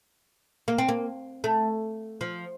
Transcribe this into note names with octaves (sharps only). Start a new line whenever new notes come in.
A#3
C4
A#3
A3
F3